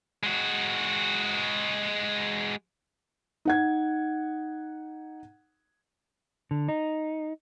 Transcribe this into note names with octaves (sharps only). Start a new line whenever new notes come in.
G#3 F#4
D#4 F#5 G#6
D3
D#4